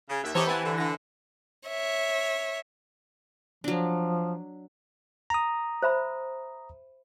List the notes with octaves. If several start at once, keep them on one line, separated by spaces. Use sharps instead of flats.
C#3
D#2 E5
E3 D#4 G4 A4 C5 C#5 D6 D#6
B3 E4 B4 G#5 A5
D3
D3 A#6
C#5 E5
F3 F#3 D4
A#5 D#6
C5 E5 B5